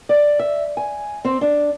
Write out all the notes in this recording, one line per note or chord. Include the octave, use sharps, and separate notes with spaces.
D5
E5
G#5
C4
D4